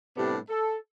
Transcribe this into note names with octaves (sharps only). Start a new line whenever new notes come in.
A2 C3 G3 B3 D4
A4